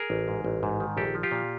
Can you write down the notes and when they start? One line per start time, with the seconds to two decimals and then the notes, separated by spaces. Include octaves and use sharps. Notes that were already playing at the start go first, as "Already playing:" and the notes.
Already playing: G#4 A#4
0.10 A1
0.28 G#2
0.45 A1
0.63 G#2
0.80 D#3
0.97 A#1 G4 A4
1.15 F3
1.23 F4 G4
1.32 A#2